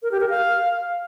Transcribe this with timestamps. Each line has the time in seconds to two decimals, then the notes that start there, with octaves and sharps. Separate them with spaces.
0.03 A#4
0.12 G4
0.20 A#4
0.29 F5